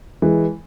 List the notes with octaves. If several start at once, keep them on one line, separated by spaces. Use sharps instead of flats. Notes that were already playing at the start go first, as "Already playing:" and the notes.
E3 G#3